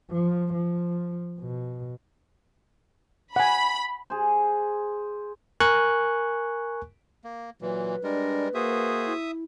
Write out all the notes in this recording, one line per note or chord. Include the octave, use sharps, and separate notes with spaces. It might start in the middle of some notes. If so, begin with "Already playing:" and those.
F3
F3
B2
F#5 G#5 B5
G#4 C5
A#4 G#5 C#6 F#6
A#3
A#2 E3 F#3 B4
G3 G#3 D4 A#4
A#3 F#4 G#4 C5 E5 D#6
E4